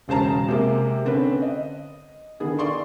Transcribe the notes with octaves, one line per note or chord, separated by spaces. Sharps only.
E1 C#3 C5 A5 A#5
C3 G#3 A#3
D3 C4 C#4 B4
D#5
D3 D#3 B3 G#4
D5 C6 C#6